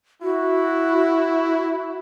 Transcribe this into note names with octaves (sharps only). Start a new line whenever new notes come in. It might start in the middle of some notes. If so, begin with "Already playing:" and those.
E4 F#4